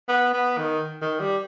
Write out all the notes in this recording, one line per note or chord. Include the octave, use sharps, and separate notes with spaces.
B3
B3
D#3
D#3
G3